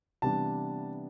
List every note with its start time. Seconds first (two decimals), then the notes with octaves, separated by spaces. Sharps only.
0.22 C3 E3 G3 B3 D4 A5